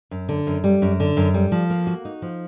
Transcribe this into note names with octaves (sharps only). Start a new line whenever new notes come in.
F#2
D3
F#2
G3
F#2
D3
F#2
G3
F3
A#3
F#4
D#4
F3